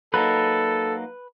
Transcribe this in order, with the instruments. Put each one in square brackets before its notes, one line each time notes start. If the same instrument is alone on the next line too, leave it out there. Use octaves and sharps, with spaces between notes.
[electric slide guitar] F#3 A#3 D#4 [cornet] A4 [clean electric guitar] B4